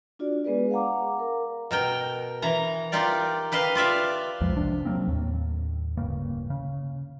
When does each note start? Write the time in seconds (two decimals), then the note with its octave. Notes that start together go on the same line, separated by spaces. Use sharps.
0.19 D4 F4 F#4 D5
0.45 G#3 B3 G#4 B4 D5
0.71 F5 F#5 A#5 D6
1.19 A#4
1.71 B2 A#4 G5
2.42 E3 A#5
2.92 D#4 F4 G4 A#4 D5
3.52 G4 B4 D#5 F5
3.75 F4 D5 E5 F5
4.41 B1 F2 F3 G#3
4.56 A1 C3 F3 D4
4.85 F#3 G3 A#3 C4
5.07 D#2 A2
5.97 D1 G2 C#3 A#3
6.50 C#3